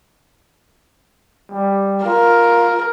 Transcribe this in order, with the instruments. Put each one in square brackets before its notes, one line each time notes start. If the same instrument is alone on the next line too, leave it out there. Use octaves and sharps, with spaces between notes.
[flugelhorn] G3
[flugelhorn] F4 [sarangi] A#4